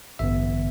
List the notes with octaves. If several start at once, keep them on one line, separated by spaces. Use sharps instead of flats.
A1 G2 D3 B3 E5